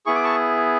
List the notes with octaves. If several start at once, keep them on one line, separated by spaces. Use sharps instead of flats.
B3 E4 G#4 C#6
D6
A5 C#6